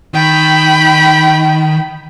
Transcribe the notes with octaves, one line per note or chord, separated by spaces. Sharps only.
D#3 G5 B5